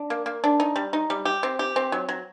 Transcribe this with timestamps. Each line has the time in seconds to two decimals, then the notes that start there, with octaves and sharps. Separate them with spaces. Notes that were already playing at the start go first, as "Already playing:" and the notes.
Already playing: D4
0.10 A#3
0.26 A#3
0.44 D4
0.60 D#4
0.76 G3
0.93 D#4
1.10 G3
1.25 G4
1.43 C4
1.59 G4
1.76 C4
1.92 F#3
2.09 F#3